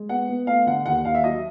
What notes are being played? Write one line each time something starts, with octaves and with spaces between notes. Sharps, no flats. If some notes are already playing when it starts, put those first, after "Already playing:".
Already playing: G#3
B3 F#5
B3
A3 F5
D3 F#5
D#2 F#5
D#2 F5
E5
F#3 D#5